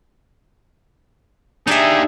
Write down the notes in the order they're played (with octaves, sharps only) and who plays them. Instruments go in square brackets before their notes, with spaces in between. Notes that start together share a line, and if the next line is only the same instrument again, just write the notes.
[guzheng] D4 E5 [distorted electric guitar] D#4 G4 [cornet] G#4